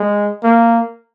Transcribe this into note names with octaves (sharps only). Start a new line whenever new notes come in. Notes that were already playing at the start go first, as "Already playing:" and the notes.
Already playing: G#3
A#3